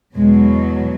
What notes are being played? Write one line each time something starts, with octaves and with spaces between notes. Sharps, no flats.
E2 B2 F#3 G#3